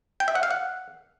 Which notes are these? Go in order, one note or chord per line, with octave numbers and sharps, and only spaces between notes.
G5
E5
F#5
F5
F#5